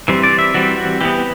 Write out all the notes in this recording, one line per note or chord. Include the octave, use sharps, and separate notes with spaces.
E3 G3 C4
D5
E5
E3 G3 C4 F#4
F#4
E3 B3 G4